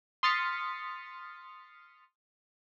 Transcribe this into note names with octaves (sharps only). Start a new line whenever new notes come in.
C6 D#6 F6 A6 B6 C#7